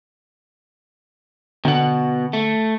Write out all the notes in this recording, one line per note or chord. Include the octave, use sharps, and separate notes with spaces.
B2 D3 F#5
A3